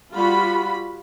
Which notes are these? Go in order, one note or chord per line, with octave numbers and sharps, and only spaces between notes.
G3 F4 F#4 B5